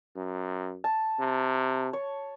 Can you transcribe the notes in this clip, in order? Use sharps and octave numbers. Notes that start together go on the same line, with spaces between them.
F#2
A5
C3
C#5